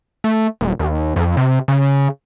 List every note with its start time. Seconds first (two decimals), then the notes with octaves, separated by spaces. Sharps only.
0.24 A3
0.61 D#1
0.79 D#2
1.16 F2
1.37 C3
1.68 C#3